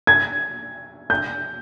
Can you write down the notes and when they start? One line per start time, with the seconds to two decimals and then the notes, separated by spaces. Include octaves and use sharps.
0.07 G#6
1.10 G6